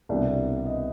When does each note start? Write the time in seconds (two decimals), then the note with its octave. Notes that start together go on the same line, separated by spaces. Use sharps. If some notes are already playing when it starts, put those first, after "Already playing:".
0.09 C2 B2 G3 D4 D5
0.66 D#5